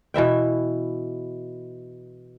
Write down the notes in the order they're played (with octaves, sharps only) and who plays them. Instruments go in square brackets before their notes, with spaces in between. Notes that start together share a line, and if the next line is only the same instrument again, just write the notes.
[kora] B2 E3 E5 G5